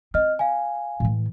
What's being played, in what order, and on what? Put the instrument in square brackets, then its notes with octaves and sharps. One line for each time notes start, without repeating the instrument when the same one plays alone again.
[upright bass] C4 [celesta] D#5 F6
[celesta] F5 G#5
[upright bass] A2 E3